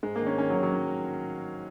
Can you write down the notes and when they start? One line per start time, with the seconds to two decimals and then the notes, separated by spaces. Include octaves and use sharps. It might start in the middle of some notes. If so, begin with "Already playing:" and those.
0.03 G#2 G#3
0.16 A#3
0.22 D#3 C#4
0.38 D#3 C#4
0.50 F#3
0.56 D#3
0.63 F#3
0.74 D#3